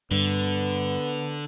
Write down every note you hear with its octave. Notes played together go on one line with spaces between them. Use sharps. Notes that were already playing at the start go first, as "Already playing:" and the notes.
G2 D3 B3